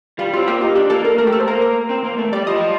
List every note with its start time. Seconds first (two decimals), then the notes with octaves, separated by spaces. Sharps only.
0.19 G3 F4
0.34 C4 F4
0.47 A#3 G4
0.61 D#4 F4
0.75 D4 G4
0.90 A#3 A4
1.04 A#3 A#4
1.18 A3 A#4
1.27 G4
1.32 A3 A4
1.40 C5
1.47 A#3 A#4
1.61 A#4
1.89 C4
2.04 A#3
2.18 A3
2.32 G3 D5
2.47 F3 D#5
2.54 G3
2.61 F3